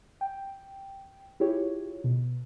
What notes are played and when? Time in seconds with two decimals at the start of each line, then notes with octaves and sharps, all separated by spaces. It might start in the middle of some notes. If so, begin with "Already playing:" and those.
0.21 G5
1.40 E4 F4 G4 G#4 C#5
2.04 B2